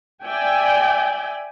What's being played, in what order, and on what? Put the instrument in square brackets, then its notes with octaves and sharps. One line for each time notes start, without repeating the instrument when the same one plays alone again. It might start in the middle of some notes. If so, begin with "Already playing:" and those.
[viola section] D5 E5 G5 G#5